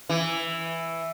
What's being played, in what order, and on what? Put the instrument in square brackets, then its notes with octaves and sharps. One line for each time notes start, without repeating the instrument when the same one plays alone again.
[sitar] E3